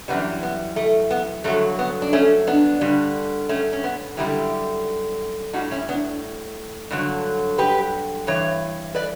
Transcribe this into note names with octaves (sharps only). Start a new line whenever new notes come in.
F#2 E3 G3 B3 D4
B3
A3
B3
G2 D3 F#3 A3
B3
D4
A3 C#4
B3 D4
G2 D3 G3
A3 C#4
C#4
B3
F#2 D3 G3 E4 G4
A2 G3 D4 F#4
C#4 E4
B3 D4
G2 D3 F#3
G4 B4
G2 E3 C#5
B4 D5